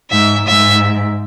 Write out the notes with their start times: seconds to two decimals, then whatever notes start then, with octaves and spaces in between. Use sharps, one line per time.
0.11 G#2 E5
0.47 G#2 E5